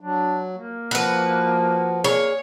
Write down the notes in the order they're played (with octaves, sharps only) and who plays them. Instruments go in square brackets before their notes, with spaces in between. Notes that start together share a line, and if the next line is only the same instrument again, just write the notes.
[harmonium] F#3 [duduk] D4
[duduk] A#3
[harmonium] F3 [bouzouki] F#4 B4
[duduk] A#3 [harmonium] G#4 [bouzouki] C#5